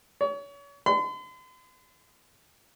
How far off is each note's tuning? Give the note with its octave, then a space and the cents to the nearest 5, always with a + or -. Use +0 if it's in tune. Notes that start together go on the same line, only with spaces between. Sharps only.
C#5 +35
C6 -45